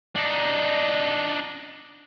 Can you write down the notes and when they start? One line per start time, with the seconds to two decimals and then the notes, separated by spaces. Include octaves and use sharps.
0.16 D4 D#4